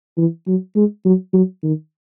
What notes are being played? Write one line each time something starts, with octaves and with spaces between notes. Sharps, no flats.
E3
F#3
G#3
F#3
F#3
D#3